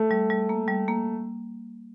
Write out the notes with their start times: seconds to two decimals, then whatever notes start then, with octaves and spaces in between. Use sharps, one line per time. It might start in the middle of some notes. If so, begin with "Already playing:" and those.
Already playing: A3
0.11 G3
0.30 G3
0.49 A#3
0.68 G3
0.88 A#3